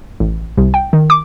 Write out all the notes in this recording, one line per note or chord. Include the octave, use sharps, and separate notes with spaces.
A1
C2
G5
D#3
D6